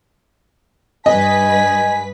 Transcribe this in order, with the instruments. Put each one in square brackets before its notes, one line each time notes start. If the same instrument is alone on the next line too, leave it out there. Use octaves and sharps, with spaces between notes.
[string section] G2 B4 B6 [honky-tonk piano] D#5 [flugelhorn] G#5